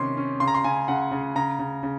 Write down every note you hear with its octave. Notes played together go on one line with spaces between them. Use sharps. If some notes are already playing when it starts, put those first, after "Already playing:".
Already playing: C3 D#3 C#4 C6
C#4
C#3 C6
A#5
C6
C#3 G#5
C#3 F#5
C#3
C#3 A#5
C#3
C#3